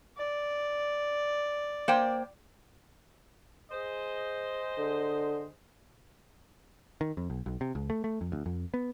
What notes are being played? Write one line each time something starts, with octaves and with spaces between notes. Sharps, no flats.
D5
A#3 C5 G5
G#4 C5 D#5
D3
D#3
F2
B1
B1
C3
C#2
A3
A3
F2
D2
F2
B3